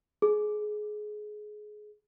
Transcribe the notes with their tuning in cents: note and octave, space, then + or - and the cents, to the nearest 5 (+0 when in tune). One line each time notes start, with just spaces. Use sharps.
G#4 +20